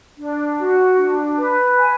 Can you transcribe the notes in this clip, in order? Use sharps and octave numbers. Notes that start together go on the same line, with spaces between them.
D4
F#4
D4
B4
G#5